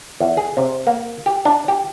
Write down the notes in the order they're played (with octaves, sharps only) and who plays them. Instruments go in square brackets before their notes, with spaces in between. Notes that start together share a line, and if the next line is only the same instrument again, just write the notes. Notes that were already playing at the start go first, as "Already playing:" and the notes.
[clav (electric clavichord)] E2
G#4
C3
A#3
G4
D4
G4